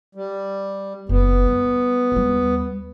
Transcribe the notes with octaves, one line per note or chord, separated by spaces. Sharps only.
G3
F#1 B3
G3
D#2 G3